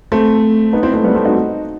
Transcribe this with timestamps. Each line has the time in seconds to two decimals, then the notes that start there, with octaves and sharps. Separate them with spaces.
0.12 A3 C4
0.73 B3 D#4
0.83 C4 E4
0.94 A3 C4
1.04 G3 B3
1.15 A3 C4
1.25 D#4 F#4